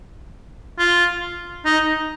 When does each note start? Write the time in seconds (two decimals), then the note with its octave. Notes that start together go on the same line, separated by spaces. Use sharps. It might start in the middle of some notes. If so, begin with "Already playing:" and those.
0.78 F4
1.65 D#4